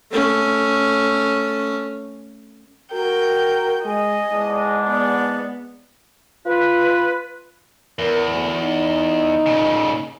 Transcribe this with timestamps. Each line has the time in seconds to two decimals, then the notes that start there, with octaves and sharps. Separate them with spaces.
0.12 A3 C#4
2.93 F#4 A#4 G5
3.85 G#3 D#5 G#5
4.31 E2 G#2 G#3 D4
4.88 B3 D5
6.46 F4 B4
7.99 E2 A#4
8.33 D2
8.63 D#4
9.46 A#2 C#3